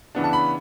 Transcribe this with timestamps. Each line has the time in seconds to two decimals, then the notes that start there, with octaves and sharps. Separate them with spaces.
0.15 C#3 E3 B3 D4
0.24 A5
0.33 B5